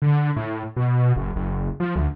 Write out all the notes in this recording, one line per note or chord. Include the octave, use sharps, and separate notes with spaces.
D3
A2
B2
F#1
F#1
F3
D2